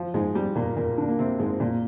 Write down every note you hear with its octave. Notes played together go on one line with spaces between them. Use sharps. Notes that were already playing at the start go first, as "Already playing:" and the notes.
Already playing: F3
G#2 G#3
G3
A#2 A#3
A#2 A#3
D3 D4
A#3
C3 C4
G#2 G#3
A#2 A#3